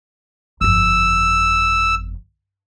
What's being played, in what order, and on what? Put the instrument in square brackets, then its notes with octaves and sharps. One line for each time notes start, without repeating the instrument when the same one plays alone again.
[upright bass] G1 F2 [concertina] E6